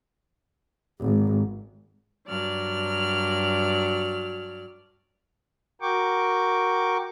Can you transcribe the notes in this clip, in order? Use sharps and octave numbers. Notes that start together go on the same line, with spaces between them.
G#1
G2 F#3 D5 F6
F#4 A#4 G5 C#6 D6